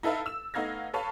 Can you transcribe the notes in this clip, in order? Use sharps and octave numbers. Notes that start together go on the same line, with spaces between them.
D#4 E4 A4 B4 E5 F5
E6 E7
A3 B3 D#4 F5 G#6 A#6
A4 B4 C#5 F5 A5